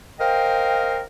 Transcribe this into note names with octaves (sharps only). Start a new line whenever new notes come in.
A#4 C5 D#5 F5 G5